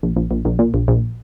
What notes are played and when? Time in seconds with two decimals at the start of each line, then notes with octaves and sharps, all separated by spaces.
0.03 A#1
0.16 A#1
0.31 A#1
0.45 A#1
0.59 A#2
0.74 A#1
0.88 A#1